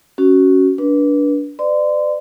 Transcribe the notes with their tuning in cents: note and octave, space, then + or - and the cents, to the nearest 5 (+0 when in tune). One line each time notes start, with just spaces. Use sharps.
C#4 +0 F#4 +15
D4 -20 B4 -30
B4 +40 D5 +25 C6 -30